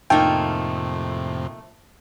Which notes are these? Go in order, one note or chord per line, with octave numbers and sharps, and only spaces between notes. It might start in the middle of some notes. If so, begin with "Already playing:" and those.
F2 A2 C3 A3 A#3 D#4 F4 G5